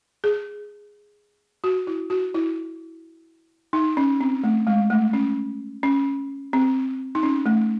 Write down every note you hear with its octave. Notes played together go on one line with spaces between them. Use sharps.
G#4
F#4
E4
F#4
E4
D#4
C#4
C4
A3
G#3
A3
C#4
C#4
C4
D#4
C#4
A3